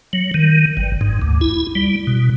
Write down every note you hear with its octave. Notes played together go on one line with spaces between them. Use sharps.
F#3
D#3
G1
G#2
D2
E4
G3
B2